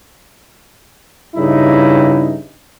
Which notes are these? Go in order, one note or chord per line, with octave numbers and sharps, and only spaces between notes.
G2 C#3 D#4 E4